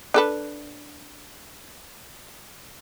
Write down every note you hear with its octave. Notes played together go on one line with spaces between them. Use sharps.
D4 A4 B4